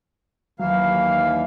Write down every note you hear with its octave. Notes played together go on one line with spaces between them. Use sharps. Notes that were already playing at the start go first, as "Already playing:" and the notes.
D#2 E3 F#3 F5